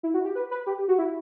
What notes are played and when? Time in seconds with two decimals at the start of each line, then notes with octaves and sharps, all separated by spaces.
0.03 E4
0.14 F#4
0.25 G4
0.35 B4
0.51 B4
0.67 G4
0.78 G4
0.88 F#4
0.98 E4